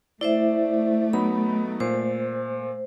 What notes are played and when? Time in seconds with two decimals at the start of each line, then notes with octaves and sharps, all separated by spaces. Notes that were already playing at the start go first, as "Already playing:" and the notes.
0.21 A3 E4 C5 D5 E5
1.13 F#3 B3 D#4 B5
1.80 A#2 C5